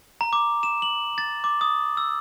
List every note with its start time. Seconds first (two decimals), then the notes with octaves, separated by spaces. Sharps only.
0.21 A#5
0.33 D6
0.63 E7
0.82 F#7
1.18 A6
1.44 D6
1.61 D#6
1.97 E6